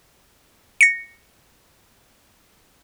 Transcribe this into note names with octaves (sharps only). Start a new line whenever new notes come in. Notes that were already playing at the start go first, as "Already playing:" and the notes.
A#6 C#7